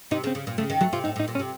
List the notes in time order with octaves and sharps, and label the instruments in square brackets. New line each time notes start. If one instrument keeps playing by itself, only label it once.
[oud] C3 [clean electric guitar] D#4
[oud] C#3
[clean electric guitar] C4
[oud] C#3
A#2
[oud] C#3 [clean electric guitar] A3
[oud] D#3
[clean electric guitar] F#3 [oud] A3
[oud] C3 [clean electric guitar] F4
[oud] A2 [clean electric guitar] D#4
[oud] A2 [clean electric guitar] D#4
[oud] A#2
[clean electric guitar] C#4
[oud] C3